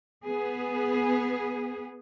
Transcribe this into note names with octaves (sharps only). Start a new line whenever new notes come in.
B3 G#4